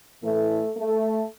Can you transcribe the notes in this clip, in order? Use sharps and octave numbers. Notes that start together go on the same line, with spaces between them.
A2 E3 A3
A3